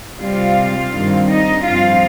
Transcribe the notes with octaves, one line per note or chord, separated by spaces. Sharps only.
C3 G3 C4 F4 F5
G2 D#3 G3 C4
D#4 D#5
G2 F3 C4 F4 F5